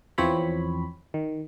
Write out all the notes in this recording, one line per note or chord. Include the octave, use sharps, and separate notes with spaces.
E2 E3 F3 C4 C#5 B5
D#3